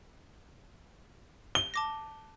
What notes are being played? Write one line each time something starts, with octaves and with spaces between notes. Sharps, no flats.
G7
A5 D6 A#6